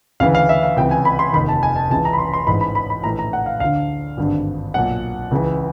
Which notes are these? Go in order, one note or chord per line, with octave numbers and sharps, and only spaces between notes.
D2 C#3 E3 F5
F5
E5
F5
C#2 C3 E3 G5
G#5
B5
C6
F1 D#2 D#3 B5
A5
G#5
A5
C#2 C#3 E3 A5
A#5
B5
C6
C6
A1 G#2 E3 B5
B5
B5
B5
A#1 A2 E3 A#5
A#5
F#5
F5
D2 D3 F5
G#1 G2 D3
B1 A#2 F#5
C#2 C#3 E3